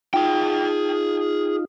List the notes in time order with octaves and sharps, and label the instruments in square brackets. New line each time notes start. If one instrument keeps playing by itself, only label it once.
[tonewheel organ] D#4 F4 [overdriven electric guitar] G#4 G5